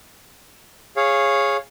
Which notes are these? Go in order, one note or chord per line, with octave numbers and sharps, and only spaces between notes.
G#4 C#5 F5